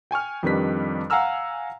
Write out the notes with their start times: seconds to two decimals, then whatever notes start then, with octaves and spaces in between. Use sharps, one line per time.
0.11 G5 G#5 C#6 F6
0.43 F2 D#3 G3 D4 B4 B6
1.10 F5 F#5 G#5 A#5 E6 F6